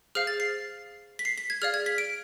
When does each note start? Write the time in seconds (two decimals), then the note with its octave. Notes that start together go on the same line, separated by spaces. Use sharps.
0.15 G#4 C5 F5 F6
0.27 A6
0.40 C7
1.19 B6
1.25 C7
1.38 B6
1.50 G#6
1.62 G#4 D5 F5 F6
1.74 G#6
1.86 B6
1.98 D7